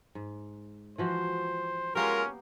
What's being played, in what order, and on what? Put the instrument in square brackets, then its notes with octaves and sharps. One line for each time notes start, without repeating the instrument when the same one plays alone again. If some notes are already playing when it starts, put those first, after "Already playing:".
[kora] G#2
[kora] E3 F3 F#4 [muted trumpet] C5
[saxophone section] G#3 F4 A#4 [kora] A#3 B3 G4 [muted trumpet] C#4